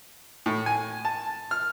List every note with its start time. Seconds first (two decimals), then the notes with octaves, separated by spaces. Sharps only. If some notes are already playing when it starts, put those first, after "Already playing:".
0.46 A2
0.66 G#5
1.05 A5
1.51 F6